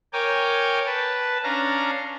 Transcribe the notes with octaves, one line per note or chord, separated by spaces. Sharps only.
A#4 C#5 G5 G#5 D6
B4 A5
C#4 D4 F5 A#5